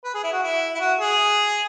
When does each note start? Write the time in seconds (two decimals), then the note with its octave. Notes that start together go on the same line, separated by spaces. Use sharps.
0.04 B4
0.14 G#4
0.24 E4
0.32 F#4
0.42 E4
0.74 E4
0.80 F#4
0.99 G#4